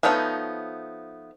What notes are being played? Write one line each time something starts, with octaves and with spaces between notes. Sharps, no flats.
F3 A3 B3 D#4 C#5